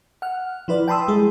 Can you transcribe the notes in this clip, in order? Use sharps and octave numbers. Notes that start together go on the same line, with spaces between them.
F#5 F6
F3 E4 B4 D5
G5 A5 B5 C6 D#6 E6
G3 G#3 E4 G#4